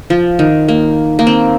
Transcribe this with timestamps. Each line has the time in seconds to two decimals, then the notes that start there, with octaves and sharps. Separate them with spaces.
0.10 F3
0.39 D#3
0.68 A#3
1.19 A#3
1.27 C4